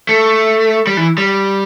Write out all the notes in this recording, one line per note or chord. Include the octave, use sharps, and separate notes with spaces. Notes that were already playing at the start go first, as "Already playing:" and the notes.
A3
G3
E3
G3